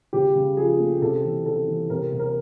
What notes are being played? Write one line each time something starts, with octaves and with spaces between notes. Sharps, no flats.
C#3 G4
C#3
F3 G#4
A3
C3 A4
E3
E3 A4
E3
C3 A#4
C3
A#4